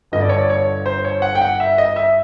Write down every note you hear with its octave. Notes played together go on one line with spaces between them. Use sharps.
G1 G2 D3 D#5
D5
C#5
D5
C#5
C5
C#5
F#5
G5
F#5
E5
D#5
E5